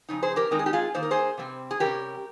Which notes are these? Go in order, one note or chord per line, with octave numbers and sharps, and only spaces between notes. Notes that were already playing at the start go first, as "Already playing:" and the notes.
F2 C#3 D#4
G#4 C5
G4 A#4
D#3 G#3 C4 D#4 A#4
G#4
G4
F4 G#4
D#3 A#3 D#4 C5
A#4
G#4 C5
C3 G3 C4
G#4
C3 G3 C#4 G4 A#4